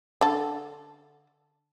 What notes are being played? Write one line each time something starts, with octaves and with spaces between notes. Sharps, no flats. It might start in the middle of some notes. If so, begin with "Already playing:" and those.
D3 A4